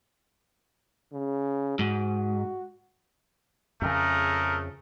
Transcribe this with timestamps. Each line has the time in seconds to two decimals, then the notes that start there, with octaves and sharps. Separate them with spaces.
1.12 C#3
1.79 G#2 F#4
3.82 F2 C#3 A3 G#4 A#4